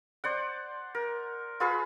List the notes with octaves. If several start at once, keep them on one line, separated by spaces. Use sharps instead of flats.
C5 D5 F#5
A#4
F4 G#4 B4